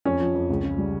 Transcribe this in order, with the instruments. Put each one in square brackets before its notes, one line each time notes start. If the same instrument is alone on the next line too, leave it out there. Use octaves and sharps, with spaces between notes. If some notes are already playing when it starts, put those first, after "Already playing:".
[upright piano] F2 C#4
F3
F2
C#2
C#3
G3